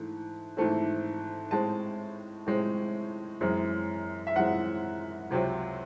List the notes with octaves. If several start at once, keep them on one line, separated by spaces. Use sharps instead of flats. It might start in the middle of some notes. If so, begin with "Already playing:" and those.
Already playing: G#2 E3 A3
G#2 E3 A3 C4
A2 G#3 C4 A5
A2 G#3 C4
F#2 E3 G#3 C4
E5
F#2 E3 G#3 C4 F#5
C#2 C3 F#3 C4